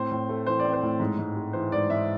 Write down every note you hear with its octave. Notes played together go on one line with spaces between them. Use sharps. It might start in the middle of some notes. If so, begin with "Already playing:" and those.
Already playing: A2 C4 C5
A2
A3
E3 C5
D5
C4
C5
A2
G#2
G#2
G#3
E3 C5
G#2 D5
G#2 E5